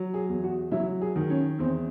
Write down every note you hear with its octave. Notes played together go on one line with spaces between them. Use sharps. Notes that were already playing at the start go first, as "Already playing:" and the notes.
Already playing: F#3
G#4
E2
F#4
F#3 E4
G#4
D#3
C#4
E2 C4